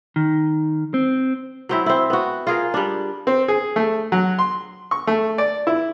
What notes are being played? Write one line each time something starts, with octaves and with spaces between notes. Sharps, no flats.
D#3
C4
F#3 C4 E4
C4 E4
B3 F#4
F4 G#4 A#4
G3 D4
C4
G#4
A3
F#3
C6
C#6
A3
D5
E4